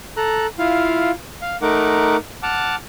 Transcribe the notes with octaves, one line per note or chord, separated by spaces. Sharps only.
A4 A#5 F#6
E4 F4 F5
F5
A3 D#4 A#4 F#5 D6
F#5 A5 D6 F6